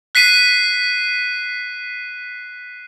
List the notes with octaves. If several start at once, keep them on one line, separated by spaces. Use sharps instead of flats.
F#6 B6 C7 D#7